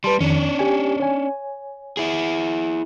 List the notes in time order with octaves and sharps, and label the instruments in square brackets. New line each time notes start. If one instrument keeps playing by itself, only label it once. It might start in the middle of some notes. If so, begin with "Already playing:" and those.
[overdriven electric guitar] G3 [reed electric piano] B4 A5 C6
[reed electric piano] F2 D#3 [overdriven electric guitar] C#4 D4
[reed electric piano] G4 G#5
C#5 G#5
[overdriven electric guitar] E4 G#4